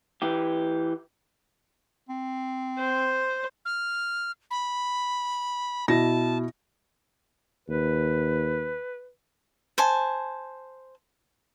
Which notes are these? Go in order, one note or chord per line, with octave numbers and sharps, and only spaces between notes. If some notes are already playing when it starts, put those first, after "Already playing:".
E3 G4
C4
C5
F6
B5
B2 E4 A5 A#6
D#2 B4
C5 G#5 A5